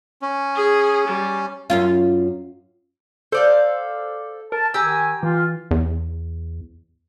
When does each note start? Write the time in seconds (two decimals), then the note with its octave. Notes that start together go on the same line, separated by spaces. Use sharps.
0.22 C#4
0.56 G#4
1.08 G3
1.70 F#2 C#4 F4
3.32 A4 C5 D5 F5
4.52 A#4 A5
4.74 D#3 G4 G#5 A#5 E6
5.23 E3 F4
5.71 E2